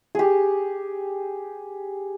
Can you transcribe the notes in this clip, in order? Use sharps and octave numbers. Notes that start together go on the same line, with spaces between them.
G4 G#4